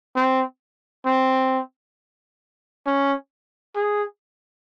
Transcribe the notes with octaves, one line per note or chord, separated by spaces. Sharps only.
C4
C4
C#4
G#4